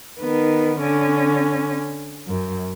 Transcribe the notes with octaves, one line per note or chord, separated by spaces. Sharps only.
D#3 B3
D3 C#4
F#2